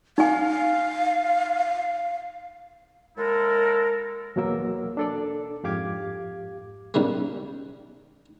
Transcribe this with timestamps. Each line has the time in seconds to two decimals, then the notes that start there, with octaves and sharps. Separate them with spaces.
0.18 D#4 F5 G#5
3.17 D#2 G#3 E4 A4 A#4
4.36 E2 B2 F#3 A#3 A#4 E6
4.97 D4 A4 D5
5.64 F2 G#2 G4 F5 D6 G#6
6.94 F#2 B2 D#3 G3 G#3